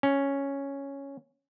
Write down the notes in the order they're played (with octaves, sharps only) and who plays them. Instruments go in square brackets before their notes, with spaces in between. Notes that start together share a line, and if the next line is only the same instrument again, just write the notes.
[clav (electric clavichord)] C#4